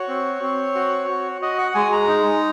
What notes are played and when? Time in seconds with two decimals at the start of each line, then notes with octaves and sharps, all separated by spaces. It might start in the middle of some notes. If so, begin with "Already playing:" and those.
Already playing: F#4 C#5
0.08 C4
0.42 C4
0.75 F#4
1.09 F#4
1.42 F#4 D#5
1.58 F#5
1.75 G#3 G#5
1.92 A#5
2.08 D#4